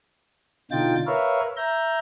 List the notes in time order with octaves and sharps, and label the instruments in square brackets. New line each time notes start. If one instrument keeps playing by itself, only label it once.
[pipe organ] B2 D3 D#4 F4 G5 A6
A#4 B4 C#5 E5 F5
E5 A#5 G6